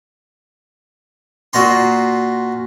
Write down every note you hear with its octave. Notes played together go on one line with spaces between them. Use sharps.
A#2 F#4 A#5 C6